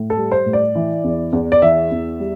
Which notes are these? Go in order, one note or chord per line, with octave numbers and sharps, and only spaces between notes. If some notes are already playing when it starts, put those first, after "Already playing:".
Already playing: A2
A4
G3
C5
A2
D5
E3
E2
E2
D5
E3 E5
E2
G3